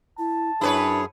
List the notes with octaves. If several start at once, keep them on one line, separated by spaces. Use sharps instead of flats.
E4 A5
F#2 D4 E4 G#4 B4 C#5